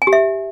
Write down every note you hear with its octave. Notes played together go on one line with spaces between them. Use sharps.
G#5
G4
E5